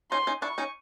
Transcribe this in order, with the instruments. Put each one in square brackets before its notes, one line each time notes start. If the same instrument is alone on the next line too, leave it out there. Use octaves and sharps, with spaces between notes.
[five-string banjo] C#4 D#4 [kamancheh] C6
[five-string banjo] C#4 D#4
[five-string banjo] D4 E4 [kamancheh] C#6
[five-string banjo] C#4 D#4